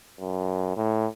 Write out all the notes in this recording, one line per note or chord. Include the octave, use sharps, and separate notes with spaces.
F#2
A2